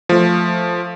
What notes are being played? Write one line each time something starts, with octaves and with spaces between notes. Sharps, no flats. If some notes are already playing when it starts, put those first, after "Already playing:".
F3 A3